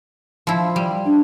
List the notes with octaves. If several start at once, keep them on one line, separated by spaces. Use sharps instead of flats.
F3 E4
G3
D4